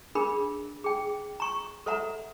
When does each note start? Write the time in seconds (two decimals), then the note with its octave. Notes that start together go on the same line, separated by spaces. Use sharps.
0.15 D4 G#4 A#4 B5
0.84 G#4 G5
1.40 A#5 C#6
1.86 A4 C5 E5 F#5 A#5